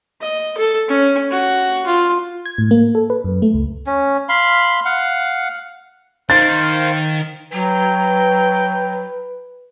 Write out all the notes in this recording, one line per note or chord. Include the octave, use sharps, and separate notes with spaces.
D#5
A4
C#4
F#4
F4
G#6
A2
A#3
A4
B4
F#2
A3
C#2
C#4
F5 B5 C6
F5 F#5
D#3 A#4 C5 F5 A6
F#3 B4 G5